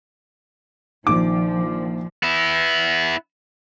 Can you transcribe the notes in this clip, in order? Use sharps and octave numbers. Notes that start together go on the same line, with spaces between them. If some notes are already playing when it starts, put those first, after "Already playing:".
A#1 D#3 F3 D6
B3 E4